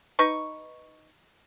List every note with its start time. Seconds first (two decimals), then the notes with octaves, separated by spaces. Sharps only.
0.19 D#4 B4 C#6